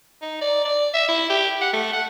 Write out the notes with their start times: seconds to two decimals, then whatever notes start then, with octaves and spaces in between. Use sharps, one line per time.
0.22 D#4
0.41 D5
0.65 D5
0.94 E5
1.08 E4
1.30 G4
1.61 F#5
1.73 A3
1.93 F#5